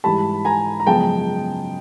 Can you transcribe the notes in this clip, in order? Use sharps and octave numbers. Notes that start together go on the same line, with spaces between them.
G#2 E3 G3 A5 B5
G#5 A#5
A#5
F#2 C#3 F3 G#3 B3 G5 A5